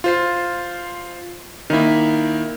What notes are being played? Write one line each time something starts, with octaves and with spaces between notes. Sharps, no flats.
F4 C5 C7
D#3 A#3 D#4 E4